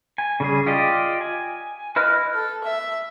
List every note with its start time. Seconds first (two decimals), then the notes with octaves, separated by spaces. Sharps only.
0.18 G#5
0.40 C#3 G3 G#4
0.66 F4 G4 D5 D#5
1.21 G#5
1.96 E4 B4 D#5 F6
2.35 A4
2.64 E5